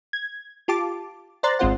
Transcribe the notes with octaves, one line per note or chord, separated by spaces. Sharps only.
G#6
F4 G4 A5 D6
C5 D5 A#5 C6 F#6 A6
G#1 G#3 C4 F4 C5 F#5